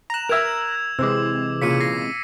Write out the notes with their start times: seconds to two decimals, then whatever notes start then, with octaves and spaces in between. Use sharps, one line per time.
0.10 A#5 F#6 E7 F7
0.29 A#4 E5 E6 G#6 F7
0.99 C3 E3 G#3 C4 D6 E6
1.62 A#2 C#3 B6 C#7 D#7
1.80 A#6 C7